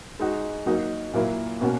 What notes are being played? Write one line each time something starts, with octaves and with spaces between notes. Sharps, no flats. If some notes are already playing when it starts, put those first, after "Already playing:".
G#3 D#4 F#4
F#3 A#3 D#4 F#4
A#2 F#3 A#3 E4
B2 A#3 C#4 F#4